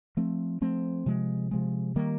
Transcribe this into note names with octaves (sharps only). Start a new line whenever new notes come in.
F3 A3 C4
F3 A3 C4
C3 F3 G#3
C3 F3 G#3
D#3 G3 A#3